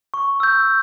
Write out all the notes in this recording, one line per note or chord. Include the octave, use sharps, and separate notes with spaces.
C#6
E6 G6